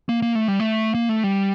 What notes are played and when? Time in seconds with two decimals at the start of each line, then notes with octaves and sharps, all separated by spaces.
0.09 A#3
0.22 A#3
0.35 A3
0.48 G3
0.60 A3
0.94 A#3
1.09 A3
1.24 G3